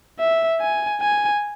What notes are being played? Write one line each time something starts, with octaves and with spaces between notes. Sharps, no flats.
E5
G#5
G#5